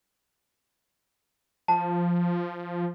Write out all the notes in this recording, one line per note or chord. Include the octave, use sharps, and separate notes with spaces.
F3 A5